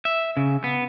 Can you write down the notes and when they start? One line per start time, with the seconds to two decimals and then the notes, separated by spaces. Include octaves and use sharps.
0.05 E5
0.37 C#3
0.64 B3